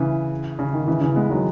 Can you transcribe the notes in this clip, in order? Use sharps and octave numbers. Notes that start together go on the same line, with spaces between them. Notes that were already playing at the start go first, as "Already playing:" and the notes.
Already playing: C#3 E3
C#3
D#3
C#3 E3
C#3 E3
G#3 B3
D#3 F#3